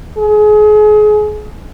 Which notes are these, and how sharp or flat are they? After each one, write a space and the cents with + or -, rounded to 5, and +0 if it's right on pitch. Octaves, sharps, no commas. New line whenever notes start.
G#4 +30